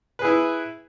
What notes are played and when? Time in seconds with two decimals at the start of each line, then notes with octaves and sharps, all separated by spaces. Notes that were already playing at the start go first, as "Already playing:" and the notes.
0.19 B4
0.22 G#4
0.25 E4